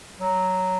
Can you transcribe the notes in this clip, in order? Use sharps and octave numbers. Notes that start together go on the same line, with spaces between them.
F#3